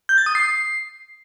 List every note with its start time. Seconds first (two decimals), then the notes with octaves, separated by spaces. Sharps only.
0.09 G6
0.18 A6
0.26 D#6
0.35 C7